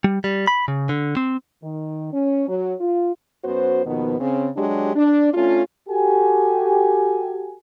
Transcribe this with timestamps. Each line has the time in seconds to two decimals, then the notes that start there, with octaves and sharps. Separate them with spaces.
0.04 G3
0.24 G3
0.47 B5
0.68 C#3
0.89 D3
1.17 C4
1.62 D#3
2.13 C#4
2.49 F#3
2.80 F4
3.44 F#2 B3 F#4 C5
3.86 D#2 B2 D#3 F3 B3
4.20 C#3 C4 C#4
4.56 F#3 G#3 D4 G4
4.96 D4
5.34 A3 C#4 D4 F4
5.89 F#4 G4 A4 G#5